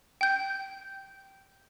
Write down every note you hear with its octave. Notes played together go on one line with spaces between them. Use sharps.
G5 G6